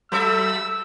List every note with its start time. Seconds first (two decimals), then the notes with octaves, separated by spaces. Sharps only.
0.12 F#3 A4 E5 E6